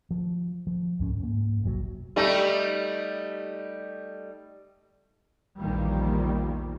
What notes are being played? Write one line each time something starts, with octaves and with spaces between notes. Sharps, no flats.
F3
F3
C#2 G#2 C#4
G#2 A#3
F1 B1 A2 F#3
G3 A3 D#4
A#1 E2 A#2 D#3 G3 A#3